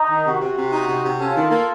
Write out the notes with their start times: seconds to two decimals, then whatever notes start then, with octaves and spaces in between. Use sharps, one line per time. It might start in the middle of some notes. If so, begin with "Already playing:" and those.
Already playing: D#4
0.09 D#3
0.24 C3 F#4
0.41 C3
0.56 C3
0.72 D#4
0.88 C3
1.04 C3
1.19 C#4 F4 A4
1.36 D#3
1.51 A#3